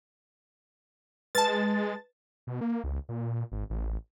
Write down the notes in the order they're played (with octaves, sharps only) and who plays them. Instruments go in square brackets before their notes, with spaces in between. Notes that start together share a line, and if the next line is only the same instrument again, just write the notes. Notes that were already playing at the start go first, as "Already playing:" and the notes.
[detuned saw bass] G#3 [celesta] B4 [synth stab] A5 A6
[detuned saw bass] B2
A#3
C#2
A#2
G#1
A1